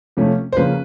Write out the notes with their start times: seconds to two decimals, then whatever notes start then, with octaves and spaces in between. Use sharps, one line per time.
0.17 C3 F3 A3 C#4
0.52 C5
0.57 C#3 F3 A#3 C#4 B4